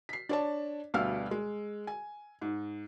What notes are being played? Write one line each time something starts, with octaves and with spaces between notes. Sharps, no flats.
B6 C7
D4 C#5 A5
D2 B2 G3 F5 E6 F6
G#3
G#5
G#2